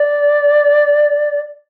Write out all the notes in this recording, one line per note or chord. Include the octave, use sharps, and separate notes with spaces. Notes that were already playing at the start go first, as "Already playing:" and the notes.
Already playing: D5